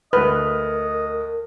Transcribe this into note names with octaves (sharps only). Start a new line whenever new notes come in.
D2 A#4 B4 D#5 F6